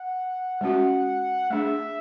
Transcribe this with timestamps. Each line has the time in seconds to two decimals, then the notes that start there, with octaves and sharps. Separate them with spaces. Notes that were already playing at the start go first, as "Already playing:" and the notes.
Already playing: F#5
0.61 G#3 C#4 F#4
1.50 A3 D4 G#4 E5